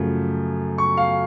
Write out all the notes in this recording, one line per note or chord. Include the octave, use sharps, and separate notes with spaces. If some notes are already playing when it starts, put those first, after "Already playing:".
Already playing: F#2 C#3 F3 A3
C#6
F5